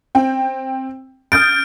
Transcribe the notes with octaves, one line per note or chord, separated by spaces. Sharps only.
C4 G5
D#6 F6 G6 A6 D7